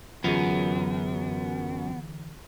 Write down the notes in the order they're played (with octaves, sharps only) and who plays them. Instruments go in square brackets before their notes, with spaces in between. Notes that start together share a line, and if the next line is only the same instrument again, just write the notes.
[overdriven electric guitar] F#2 [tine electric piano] D3 E3 [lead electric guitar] B3 [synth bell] F4 G#4